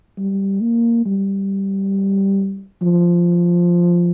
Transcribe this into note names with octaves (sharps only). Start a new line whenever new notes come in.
G3
A#3
G3
F3